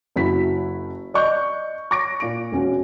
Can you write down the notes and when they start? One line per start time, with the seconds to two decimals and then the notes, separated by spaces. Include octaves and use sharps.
0.16 F#1 E4 F#4 B6
1.14 D5 D#5 C#6 F#6 G6
1.91 C#6 D6 A#6 D7
2.20 A#2 D7
2.52 E1 C#4 F#4